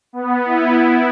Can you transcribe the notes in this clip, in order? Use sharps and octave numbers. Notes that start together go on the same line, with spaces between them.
B3
E4